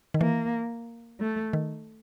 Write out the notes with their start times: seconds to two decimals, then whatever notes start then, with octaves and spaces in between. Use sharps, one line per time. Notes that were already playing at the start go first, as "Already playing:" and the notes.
0.14 D#3
0.20 E3 A#3
1.20 A3
1.53 D#3